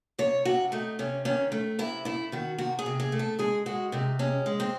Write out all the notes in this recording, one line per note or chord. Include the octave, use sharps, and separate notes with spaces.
C3 C#5
C3 F#4
A3 D#4
C3 C#4
D#3 C#4
A3
C3 E4
A3 E4
D#3 F#4
C3 F#4
G#4
C3
G#4
A3
A4
G#3 G#4
G#3 F#4
C3 D#4
G#3 C#4
G#3
C4